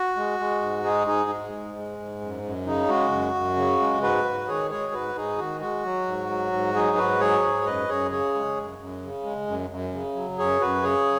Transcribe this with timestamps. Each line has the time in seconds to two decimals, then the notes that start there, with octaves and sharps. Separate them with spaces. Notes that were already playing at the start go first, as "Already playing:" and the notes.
Already playing: F#4
0.16 G#3
0.39 G#3
0.61 G#2
0.84 G#3 D#4 G#4
1.07 G#2 D#4 G#4
1.30 G#3
1.52 G#2
1.76 G#3
1.98 G#2
2.21 F#2
2.43 F#2
2.66 C#3 D#4
2.88 G#3 F#4
3.12 F#2
3.34 F#2
3.56 C#3
3.80 G#3
4.02 G#2 F#4 B4
4.25 G#2
4.47 D#3 G#4 C#5
4.70 G#3 G#4 C#5
4.93 G#2 F#4 B4
5.15 G#2 D#4 G#4
5.38 D#3 F#4
5.61 G#3 F#4
5.84 F#3
6.07 G#2
6.29 F#3
6.53 G#2
6.75 F#3 D#4 G#4
6.97 G#2 F#4 B4
7.20 F#3 G#4 C#5
7.43 G#2
7.66 F#2 B4 D#5
7.89 F#2 G#4 C#5
8.11 C#3 G#4 C#5
8.34 G#3
8.57 F#2
8.79 F#2
9.03 C#3
9.24 G#3
9.47 F#2
9.70 F#2
9.93 C#3
10.15 F#3
10.38 F#2 G#4 C#5
10.61 F#2 F#4 B4
10.83 C#3 G#4 C#5